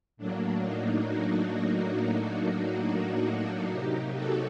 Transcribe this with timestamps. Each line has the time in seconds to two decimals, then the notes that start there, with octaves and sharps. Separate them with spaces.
0.17 A2 F#3 A#3 D4
0.61 D#4
1.06 D4 F#4
2.82 D4 F#4
3.70 C3 F#3 A#3 D#4 G4
4.14 F#4 A4